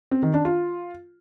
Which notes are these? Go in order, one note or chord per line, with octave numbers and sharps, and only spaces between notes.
C4
D#3
D4
F4